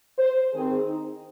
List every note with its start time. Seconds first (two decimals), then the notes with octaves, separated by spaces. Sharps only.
0.18 C5
0.52 D#3 C4 G#4
0.87 D#4